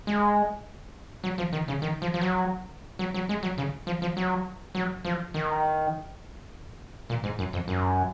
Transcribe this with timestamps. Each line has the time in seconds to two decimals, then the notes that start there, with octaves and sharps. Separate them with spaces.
0.07 G#3
1.24 F#3
1.38 F3
1.53 D#3
1.68 C#3
1.82 D#3
2.02 F3
2.14 F3
2.21 F#3
2.99 F#3
3.14 F#3
3.29 G#3
3.43 F#3
3.58 C#3
3.87 F3
4.02 F3
4.17 F#3
4.75 F#3
5.05 F3
5.34 D#3
7.10 A#2
7.24 G#2
7.39 F#2
7.53 F2
7.68 F#2